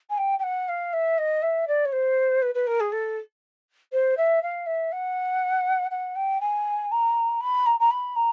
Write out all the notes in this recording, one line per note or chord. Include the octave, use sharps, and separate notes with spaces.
G#5
G5
G5
F#5
F5
E5
D#5
E5
D5
C#5
C5
B4
B4
A#4
G#4
A4
C5
E5
F5
E5
F#5
F#5
G5
G#5
A#5
B5
A#5
A#5
B5
A#5